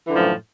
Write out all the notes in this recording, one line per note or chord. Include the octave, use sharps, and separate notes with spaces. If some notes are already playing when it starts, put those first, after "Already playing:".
F#2 A2 D3 E3 F3